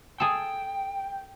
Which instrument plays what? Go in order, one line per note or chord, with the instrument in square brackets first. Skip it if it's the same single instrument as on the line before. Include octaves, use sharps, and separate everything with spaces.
[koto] G#4 A4 [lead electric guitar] G5